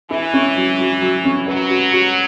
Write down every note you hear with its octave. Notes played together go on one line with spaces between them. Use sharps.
E3 E4
C#4
F#3
F#3
F#3
C#4
F#3 B4
F#4
F#4